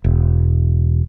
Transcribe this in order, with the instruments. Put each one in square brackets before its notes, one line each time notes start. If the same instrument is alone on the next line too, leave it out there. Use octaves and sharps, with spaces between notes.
[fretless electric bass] E1